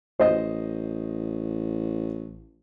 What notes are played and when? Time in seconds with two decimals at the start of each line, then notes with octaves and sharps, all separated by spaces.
0.19 A1 C5 D#5